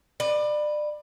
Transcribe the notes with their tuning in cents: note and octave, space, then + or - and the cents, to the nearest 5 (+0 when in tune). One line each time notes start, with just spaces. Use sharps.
B4 +0 D5 +30